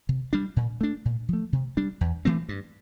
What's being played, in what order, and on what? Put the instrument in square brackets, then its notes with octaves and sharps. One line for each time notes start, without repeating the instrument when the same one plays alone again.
[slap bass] C3
G3 D4
A#2
A3 D4
A#2
F3 A3
C3
G3 D4
E2
E3 A3 C4
G2